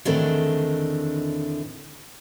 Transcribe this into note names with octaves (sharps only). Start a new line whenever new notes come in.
E2 A2 D3 D#3 C4 D4